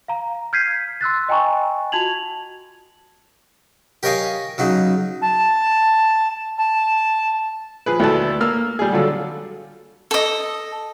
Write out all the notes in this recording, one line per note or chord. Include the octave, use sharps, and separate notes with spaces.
F5 A#5
F6 G6 G#6 B6 C7 D#7
C6 E6 F#6 A6
D#5 G5 G#5 A#5 C#6
F4 F#4 A5 G#6 F7 F#7
G4 A#4 C#5 D#5 F5 G#5
C#3 F#3 D#4
A5
A5
F3 G#4 B4
D2 E4 A4 B4 A5
A#3 E6 F6
G3 G#4
D3 F#3 F4 A4
A4 D#5